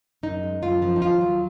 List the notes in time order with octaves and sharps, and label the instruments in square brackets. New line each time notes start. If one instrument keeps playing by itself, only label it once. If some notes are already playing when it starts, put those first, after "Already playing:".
[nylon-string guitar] F#2 D#4
G#3
F#2 F4
F3
D#4
D#2 F4
F#3